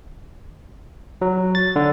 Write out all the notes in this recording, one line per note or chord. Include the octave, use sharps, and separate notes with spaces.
F#3
A6
D3